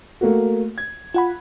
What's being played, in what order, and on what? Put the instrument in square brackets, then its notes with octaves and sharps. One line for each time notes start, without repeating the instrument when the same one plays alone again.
[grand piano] A3 A#3 F#4
G#6
[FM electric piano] F4 F#5 B5